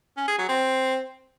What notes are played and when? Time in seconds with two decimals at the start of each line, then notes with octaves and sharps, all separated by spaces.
0.17 C#4
0.27 G#4
0.38 F#3
0.49 C4